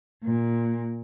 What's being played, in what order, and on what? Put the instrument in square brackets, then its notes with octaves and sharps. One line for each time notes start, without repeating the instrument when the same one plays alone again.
[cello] A#2